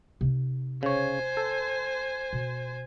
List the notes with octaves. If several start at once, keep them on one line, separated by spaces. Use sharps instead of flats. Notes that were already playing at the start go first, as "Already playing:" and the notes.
C3 D#4
C#3 C5 C#5 G#5
A4
B2